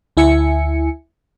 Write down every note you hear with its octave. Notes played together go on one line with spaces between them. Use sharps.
D2 E4 E5 G#5 C#7